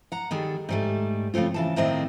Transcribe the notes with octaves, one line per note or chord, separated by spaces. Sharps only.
F#5 A#5
D#3 G3 G#4 A4
G#2 G3 A3
C#3 F3 A3 C4 F4
C#3 E3 A5
A2 D#3 A#3 C4 E4 D#5